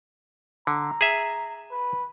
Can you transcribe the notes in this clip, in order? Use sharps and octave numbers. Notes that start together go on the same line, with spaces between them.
D3 A#5
G#4 E5
B4